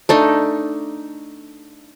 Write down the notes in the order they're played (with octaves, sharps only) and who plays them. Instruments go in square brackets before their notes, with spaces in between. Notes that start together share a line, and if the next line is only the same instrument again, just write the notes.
[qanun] A3 D4 D#4